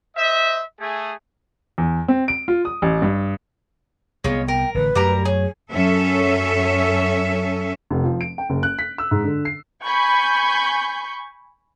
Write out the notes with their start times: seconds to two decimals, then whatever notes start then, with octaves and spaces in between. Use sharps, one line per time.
0.16 C5 D#5 E5
0.80 A3 G#4
1.78 E2
2.08 C4
2.28 D7
2.48 F4
2.65 D#6
2.82 A1
3.02 G2
4.24 C2 G#3 B3 F4 C#5
4.48 A#4 G5
4.75 A1 D3 B4
4.95 F#2 F#3 G3 A3 A#4 A#5
5.25 G#4 C#5
5.72 F#2 C#4 A4 E5
7.91 F1
8.04 F3
8.21 D7
8.38 G5
8.49 F#1
8.63 F#6
8.79 B6
8.98 E6
9.11 G#2
9.24 D3
9.45 C7
9.83 G#5 B5 C#6 G6